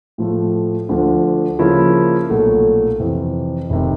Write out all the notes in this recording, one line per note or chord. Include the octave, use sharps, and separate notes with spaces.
A2 F3 A3
D2 D3 F3
C#3 F3 A#3 C#4 E4
B1 A#2 F#3 A3
F2 C3 E3
F1 C3 D#3